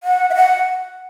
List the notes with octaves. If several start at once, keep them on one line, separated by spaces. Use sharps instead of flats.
F#5
E5
F#5